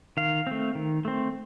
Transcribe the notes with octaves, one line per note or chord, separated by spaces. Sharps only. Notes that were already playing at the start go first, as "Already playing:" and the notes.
D#3 F5
A3 C4
D#3
A3 C4